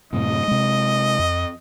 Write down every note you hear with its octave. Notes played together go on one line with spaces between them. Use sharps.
F#2 A2 C3 D#5
C3 G#3
F2